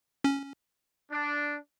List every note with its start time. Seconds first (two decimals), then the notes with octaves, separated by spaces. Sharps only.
0.24 C#4
1.12 D4